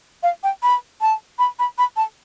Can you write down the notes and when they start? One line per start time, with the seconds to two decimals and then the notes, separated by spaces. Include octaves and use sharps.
0.23 F5
0.43 G5
0.63 B5
1.01 A5
1.39 B5
1.59 B5
1.78 B5
1.97 A5